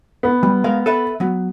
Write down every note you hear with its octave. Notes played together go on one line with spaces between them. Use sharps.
B3
G3
G#3 A#4 F5
A4 B4 E5
F#3 B3